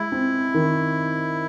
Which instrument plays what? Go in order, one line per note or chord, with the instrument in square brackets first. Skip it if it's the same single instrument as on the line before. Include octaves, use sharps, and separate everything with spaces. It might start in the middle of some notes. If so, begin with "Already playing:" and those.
Already playing: [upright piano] G#3 [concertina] E4
[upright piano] C4
D#3